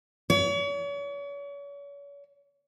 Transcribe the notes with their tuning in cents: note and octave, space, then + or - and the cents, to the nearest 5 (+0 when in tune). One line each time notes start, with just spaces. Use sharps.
C#5 +40